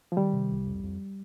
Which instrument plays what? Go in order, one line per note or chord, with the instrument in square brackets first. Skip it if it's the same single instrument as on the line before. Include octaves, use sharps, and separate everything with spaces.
[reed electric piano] F3
[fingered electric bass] D#3 [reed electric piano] G3
[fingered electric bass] C3
C2
F2
F2